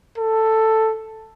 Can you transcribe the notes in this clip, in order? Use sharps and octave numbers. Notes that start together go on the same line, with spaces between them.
A4